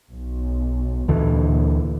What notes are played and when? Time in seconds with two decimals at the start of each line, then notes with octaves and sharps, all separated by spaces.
0.10 B1
1.08 D2 A#2 D3 E3